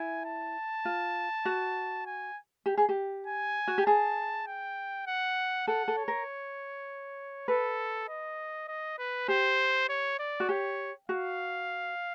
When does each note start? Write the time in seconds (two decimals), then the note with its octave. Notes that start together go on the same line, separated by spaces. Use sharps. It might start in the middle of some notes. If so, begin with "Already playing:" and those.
Already playing: E4 G#5
0.25 A5
0.85 F4
1.45 F#4
2.06 G#5
2.66 G4
2.77 G#4
2.89 G4
3.27 G#5
3.68 F#4
3.78 G4
3.86 G#4 A5
4.47 G5
5.07 F#5
5.67 A4 F#5
5.88 A4
5.98 C#5
6.08 A#4
7.48 A4 B4
8.09 D#5
8.68 D#5
8.99 B4
9.28 G4 C5
9.89 C#5
10.19 D5
10.40 F#4
10.49 G4 C#5
11.09 F#4 F5